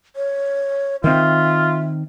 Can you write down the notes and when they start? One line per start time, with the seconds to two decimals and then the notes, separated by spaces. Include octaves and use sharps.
0.16 C#5
1.04 D#3 C4 F4 E5